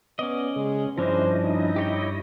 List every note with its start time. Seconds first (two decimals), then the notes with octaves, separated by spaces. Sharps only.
0.19 B3 C#4 D5 D#5
0.56 C#3 G#3
0.98 G2 F3 C#4 D4 E4 C5 D#5
1.43 D#4
1.76 G4 C#5 G5